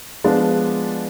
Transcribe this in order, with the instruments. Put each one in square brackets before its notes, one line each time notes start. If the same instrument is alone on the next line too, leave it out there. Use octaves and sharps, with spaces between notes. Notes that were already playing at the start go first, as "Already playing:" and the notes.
[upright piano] F3 G#3 B3 D4 F4